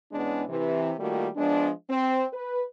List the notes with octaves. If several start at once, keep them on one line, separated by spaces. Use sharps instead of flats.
E2 E3 G#3 B3 C#4 D4
C3 E3
D#3 G3 A3 A#3 F4 F#4
F3 G#3 B3 D4
C4
B4